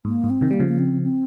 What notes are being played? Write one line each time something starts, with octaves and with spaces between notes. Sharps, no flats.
G#2 A#3
G#2
C4
C3 D#3
G3 A#3
C#3 F3
A#3
C4
C4